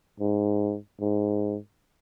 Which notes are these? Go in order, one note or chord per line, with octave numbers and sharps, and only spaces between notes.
G#2
G#2